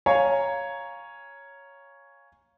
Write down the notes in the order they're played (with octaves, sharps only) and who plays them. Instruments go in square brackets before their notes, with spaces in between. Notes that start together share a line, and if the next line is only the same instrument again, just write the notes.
[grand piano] C#5 F5 G#5 A#5